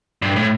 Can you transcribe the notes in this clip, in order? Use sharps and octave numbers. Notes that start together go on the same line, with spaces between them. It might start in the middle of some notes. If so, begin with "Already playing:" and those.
G2
A2